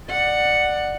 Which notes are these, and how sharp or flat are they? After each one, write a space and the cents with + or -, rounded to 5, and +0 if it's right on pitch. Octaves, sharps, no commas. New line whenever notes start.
D5 +20 F#5 +0